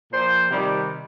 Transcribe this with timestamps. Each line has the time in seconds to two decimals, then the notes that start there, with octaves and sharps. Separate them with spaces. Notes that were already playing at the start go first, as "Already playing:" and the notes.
0.12 A#2 F3 C5
0.49 C3 D#3 G3